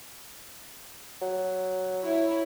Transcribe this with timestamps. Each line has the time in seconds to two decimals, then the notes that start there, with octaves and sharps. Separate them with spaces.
1.22 F#3
2.00 E4 C#5